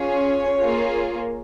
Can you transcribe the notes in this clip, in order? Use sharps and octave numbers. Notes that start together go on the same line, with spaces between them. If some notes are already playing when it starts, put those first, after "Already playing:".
Already playing: C#4 F4 G#4 C#5
A#3 F4 G#4